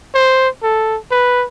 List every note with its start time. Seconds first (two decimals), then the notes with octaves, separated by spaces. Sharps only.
0.14 C5
0.63 A4
1.11 B4